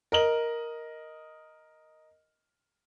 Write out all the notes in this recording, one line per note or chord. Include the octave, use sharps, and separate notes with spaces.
A#4 D#5 F#7